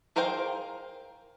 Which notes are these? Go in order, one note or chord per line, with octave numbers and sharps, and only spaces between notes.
G#4 A#4 C5 F5 G5